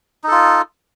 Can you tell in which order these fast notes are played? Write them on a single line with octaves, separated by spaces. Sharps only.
D#4 A4 F4